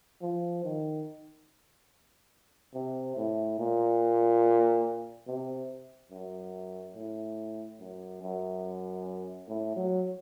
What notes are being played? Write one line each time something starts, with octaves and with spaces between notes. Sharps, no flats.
F3
D#3
C3
A2
A#2
C3
F#2
A2
F#2
F#2
A2
F#3